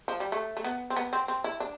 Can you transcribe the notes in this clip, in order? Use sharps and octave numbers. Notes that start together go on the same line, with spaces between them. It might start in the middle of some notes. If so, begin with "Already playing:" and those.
F3
G3
A3
A3
B3
C4
B3
C4
C4
E4
D4